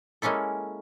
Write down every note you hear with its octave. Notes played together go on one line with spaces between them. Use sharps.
G#3 A#3 C#4 E4 A4